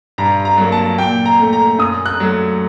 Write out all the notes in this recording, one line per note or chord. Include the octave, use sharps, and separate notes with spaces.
G2 A#5
A#5
F#3 A#3
A5
A#2 G5
A#5
A3
A#5
F#2 D#6
F#6
F#3 A3